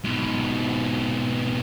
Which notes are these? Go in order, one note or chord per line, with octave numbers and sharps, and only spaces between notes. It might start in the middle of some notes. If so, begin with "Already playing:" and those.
G#2 B2